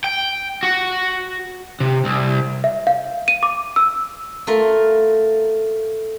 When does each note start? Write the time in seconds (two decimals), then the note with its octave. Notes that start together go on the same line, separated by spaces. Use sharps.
0.04 G5
0.63 F#4
1.80 C3
2.05 C2
2.64 E5
2.87 F5
3.28 D#7
3.43 D6
3.76 E6
4.47 A3 F4 A#4